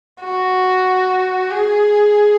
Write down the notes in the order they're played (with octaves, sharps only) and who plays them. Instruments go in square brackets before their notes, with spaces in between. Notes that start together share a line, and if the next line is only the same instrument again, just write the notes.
[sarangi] F#4
G#4